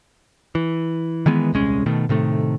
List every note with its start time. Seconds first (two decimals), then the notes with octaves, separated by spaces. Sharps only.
0.55 E3
1.26 D#3 E3 G#3 B3
1.53 D#1 C2 G#3 C#4
1.86 B2 D#3 A3
2.09 A2 C3 D#3 A3